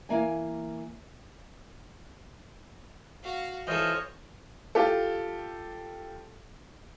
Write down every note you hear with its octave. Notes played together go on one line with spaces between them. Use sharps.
E3 A#3 G#5
F#4 F5
E3 F4 A4 C5 C#5 D#5
F4 G4 A4